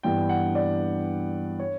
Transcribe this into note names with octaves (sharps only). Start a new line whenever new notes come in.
G2 E3 B3 D4 G5
F#5
D5
C#5